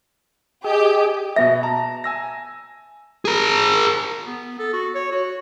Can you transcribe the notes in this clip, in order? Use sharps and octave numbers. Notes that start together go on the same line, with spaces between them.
G4 G#4 D#5
B2 B3 E5 A#6
A5 A#5
G#5 E6 A#6
G#4 A#4
B3
A4
F#4
C#5
F#4